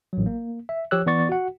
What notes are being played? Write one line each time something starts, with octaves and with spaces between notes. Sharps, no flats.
A1 F#3
A#3
E5
F3 G4 C#5 E6 F#6
E3 B3 D5 C#6 A6
F#4 F#5